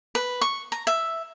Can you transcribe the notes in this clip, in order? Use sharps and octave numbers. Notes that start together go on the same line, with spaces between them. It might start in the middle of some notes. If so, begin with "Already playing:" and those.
B4
C#6
A#5
E5